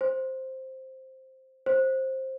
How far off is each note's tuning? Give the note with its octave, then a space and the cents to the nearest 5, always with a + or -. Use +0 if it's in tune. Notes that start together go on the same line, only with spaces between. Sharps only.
C5 +5
C5 +15